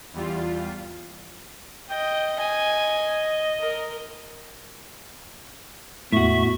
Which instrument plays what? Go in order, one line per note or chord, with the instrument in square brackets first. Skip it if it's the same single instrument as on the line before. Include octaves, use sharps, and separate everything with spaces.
[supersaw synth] E2 G3 F4
[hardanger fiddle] D#5 [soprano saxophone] G5
[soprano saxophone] D#5 [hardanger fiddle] G#5
[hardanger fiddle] A#4
[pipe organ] E2 E5 C#6 [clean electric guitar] A2 F#4